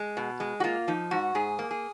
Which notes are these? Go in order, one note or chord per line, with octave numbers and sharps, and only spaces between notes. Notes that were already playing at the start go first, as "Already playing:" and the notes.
Already playing: G#3
B2
G#3
F#4
A#3 F4
F3 D#4
G#2 F#4
G#2 G#4
A#3
G#4